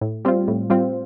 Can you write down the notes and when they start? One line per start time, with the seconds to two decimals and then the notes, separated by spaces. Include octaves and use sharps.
0.01 A2
0.25 G3 C4 F4
0.48 A2
0.70 G3 C4 F4